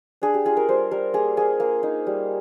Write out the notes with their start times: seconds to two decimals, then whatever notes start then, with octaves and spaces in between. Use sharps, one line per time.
0.22 D4 G#4
0.34 G4
0.45 F4 G#4
0.57 A#4
0.69 G3 C5
0.91 G3 A#4
1.13 A#3 G#4
1.37 A#3 G#4
1.60 A#3
1.83 D#4
2.07 G3